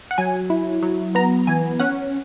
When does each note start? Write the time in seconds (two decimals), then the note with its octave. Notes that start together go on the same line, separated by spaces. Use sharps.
0.11 F#5
0.18 F#3 G#5
0.50 E4
0.82 F#3
1.15 B3 A#5
1.47 E3 G#5
1.80 C#4 F#5